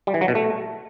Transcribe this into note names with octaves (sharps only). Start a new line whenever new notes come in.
G3
E3
F#3
B2
A3